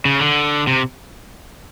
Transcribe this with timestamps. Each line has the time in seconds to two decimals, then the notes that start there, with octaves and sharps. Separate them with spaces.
0.05 C#3
0.21 D3
0.67 C3